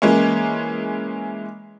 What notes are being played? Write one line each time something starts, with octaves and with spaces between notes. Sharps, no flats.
E3 G#3 A#3 C#4